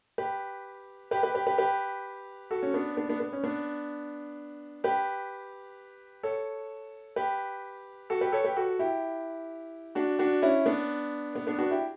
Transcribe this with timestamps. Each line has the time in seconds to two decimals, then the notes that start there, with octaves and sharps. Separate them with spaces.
0.18 G4 B4
1.11 G4 B4
1.23 G4 B4
1.35 G4 B4
1.46 G4 B4
1.58 G4 B4
2.51 F#4 A4
2.63 C#4
2.74 B3 D4
2.97 B3 D4
3.09 B3 D4
3.20 B3
3.33 C#4
3.44 B3 D4
4.84 G4 B4
6.23 A4 C#5
7.16 G4 B4
8.10 F#4 A4
8.21 G4 B4
8.32 A4 C#5
8.44 G4 B4
8.56 F#4 A4
8.79 E4 G4
9.95 D4 F#4
10.19 D4 F#4
10.42 C#4 E4
10.66 B3 D4
11.35 B3
11.47 B3 D4
11.58 D4 F#4
11.71 E4 G4